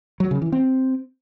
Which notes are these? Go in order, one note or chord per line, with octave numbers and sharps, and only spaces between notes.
F#3
C#3
E3
C4